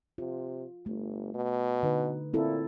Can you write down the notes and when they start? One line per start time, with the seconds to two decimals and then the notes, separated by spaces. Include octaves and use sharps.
0.18 C3 F4
0.86 G1 A3
1.34 B2
1.83 D3 D#4 B4
2.34 A#2 C4 E4 A4